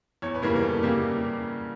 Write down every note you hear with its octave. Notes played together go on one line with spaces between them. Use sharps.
E2 C#5
B4
C#3 E3 G3 A#3 A#4
A#4
E2 A4
C#3 E3 G3 A#3 G4